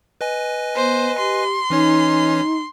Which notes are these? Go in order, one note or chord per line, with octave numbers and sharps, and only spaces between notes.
B4 D#5 G#5
B3 C5
G4 C6
E3 C#4 D#4 C#5